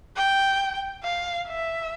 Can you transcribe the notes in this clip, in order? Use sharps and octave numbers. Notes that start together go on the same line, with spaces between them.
G5
F5
E5